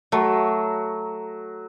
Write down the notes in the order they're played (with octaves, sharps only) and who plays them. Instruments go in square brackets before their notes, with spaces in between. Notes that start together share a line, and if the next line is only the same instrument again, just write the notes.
[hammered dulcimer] F#3 [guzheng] A3